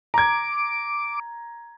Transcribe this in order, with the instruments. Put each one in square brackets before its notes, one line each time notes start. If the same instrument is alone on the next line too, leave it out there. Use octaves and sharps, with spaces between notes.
[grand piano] A#5 G#6 [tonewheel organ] D6